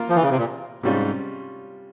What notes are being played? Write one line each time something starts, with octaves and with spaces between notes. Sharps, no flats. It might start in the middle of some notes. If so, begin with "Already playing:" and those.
Already playing: A#3 F4 A#4 F5
F3
E3
C#3
C3
A#2
G#2 C3 G3 C#4 F4